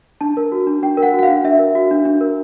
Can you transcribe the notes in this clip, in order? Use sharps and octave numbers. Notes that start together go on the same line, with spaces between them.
D4 A5
A#4
F#4
D4
D4 G5
A#4
F#5
F#4
F#5
F5
D4
D4 E5
A#4
F#4
D4
D4
A#4